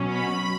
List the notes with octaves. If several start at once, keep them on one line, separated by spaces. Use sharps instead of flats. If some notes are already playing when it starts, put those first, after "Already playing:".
Already playing: B2 F#3 C#4
B5